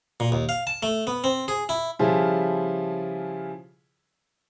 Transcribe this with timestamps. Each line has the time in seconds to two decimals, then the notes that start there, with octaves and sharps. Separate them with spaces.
0.20 A#2
0.32 D#2
0.49 F5
0.67 A5
0.83 A3
1.07 B3
1.24 C4
1.48 G#4
1.69 E4
1.99 C#3 F3 G3 E4 F4 G#4